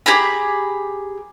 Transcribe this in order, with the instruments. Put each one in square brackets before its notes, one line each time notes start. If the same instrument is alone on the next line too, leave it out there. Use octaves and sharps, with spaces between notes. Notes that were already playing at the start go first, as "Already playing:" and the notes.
[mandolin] G4 G#4 A#5 B5